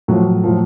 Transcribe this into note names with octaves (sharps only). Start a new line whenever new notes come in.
A2 F3 F#3
A2 F3